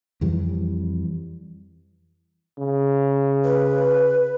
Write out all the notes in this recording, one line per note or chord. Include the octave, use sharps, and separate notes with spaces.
F2 E3 G3
C#3
B4